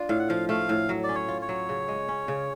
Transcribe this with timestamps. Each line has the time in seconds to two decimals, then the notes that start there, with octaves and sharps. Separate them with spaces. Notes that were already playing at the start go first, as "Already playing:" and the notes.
Already playing: D4 F4
0.09 A2 F5
0.19 F#5
0.28 F3 F5
0.49 A3 F5
0.69 A2
0.89 F#3
1.04 D5
1.09 C#4
1.15 C#5
1.28 F4
1.42 C#5
1.49 F#3
1.69 C#3
1.88 G#3
2.08 C#4
2.28 C#3